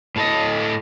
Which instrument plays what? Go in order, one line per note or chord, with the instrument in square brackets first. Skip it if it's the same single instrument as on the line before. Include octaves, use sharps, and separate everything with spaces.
[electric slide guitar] A2 A4 D#5